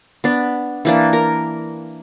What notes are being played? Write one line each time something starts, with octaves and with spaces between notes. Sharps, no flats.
B3 D4
E3 A#3 D4
A#4 A#5